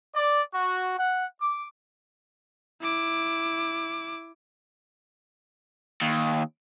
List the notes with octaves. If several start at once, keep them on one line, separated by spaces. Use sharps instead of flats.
D5
F#4
F#5
D6
E4 D6
D#2